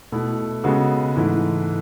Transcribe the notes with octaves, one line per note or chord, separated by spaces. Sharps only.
B2 A3 E4
C#3 G#3 B3 F#4 A4
G#2 E3 A3 E4